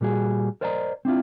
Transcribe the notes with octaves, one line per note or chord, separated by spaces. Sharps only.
A#2 G3 F#4 G#4
A#4 C5 D5 D#5 F#5 A#5
C4 D4 E4 F4